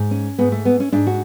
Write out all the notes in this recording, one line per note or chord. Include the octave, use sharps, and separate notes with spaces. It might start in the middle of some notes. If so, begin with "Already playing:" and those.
Already playing: G#2
C#4
G#2 B3
A3
B3
C#4
G#2 D4
F#4